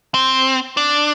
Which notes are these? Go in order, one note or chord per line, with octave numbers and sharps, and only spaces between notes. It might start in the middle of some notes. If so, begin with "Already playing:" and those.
C4
D4